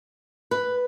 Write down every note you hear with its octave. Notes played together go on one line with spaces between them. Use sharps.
B4